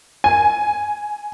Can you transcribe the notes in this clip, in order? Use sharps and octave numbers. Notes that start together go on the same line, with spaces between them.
G#5